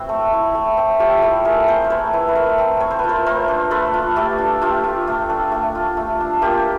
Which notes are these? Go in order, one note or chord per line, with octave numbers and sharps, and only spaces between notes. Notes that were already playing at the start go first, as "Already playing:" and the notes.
Already playing: C4 E4 F#4
A3
E4
A3
C4
A3 F4 G4
E4 G4 A4
A3 G#4 A#4
C4 A#4 C5
C5
A3 B4 C#5
E4
B4
A3 A#4 C5
C4
A3 C#5
C5
F4 B4
A#4 C5
A3 A#4 C5
D4
A3 A4 B4
F4
A3 G4 A4
D4
A3 F4 G4
F4
A3
D4
A3
F4
A3
D4
A#3 F4 G4